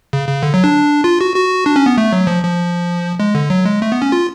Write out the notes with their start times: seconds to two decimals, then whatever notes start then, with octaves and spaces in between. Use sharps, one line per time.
0.13 C#3
0.28 C#3
0.43 D3
0.54 F#3
0.64 D4
1.04 F4
1.21 F#4
1.36 F#4
1.66 D4
1.76 C#4
1.86 B3
1.98 A3
2.13 F#3
2.27 F3
2.43 F3
3.20 G#3
3.35 D3
3.50 F#3
3.65 G#3
3.82 A3
3.92 B3
4.02 C#4
4.12 F4